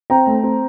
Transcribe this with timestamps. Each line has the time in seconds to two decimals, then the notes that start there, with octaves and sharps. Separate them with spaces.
0.10 C4 G5 A#5
0.27 A3
0.43 C4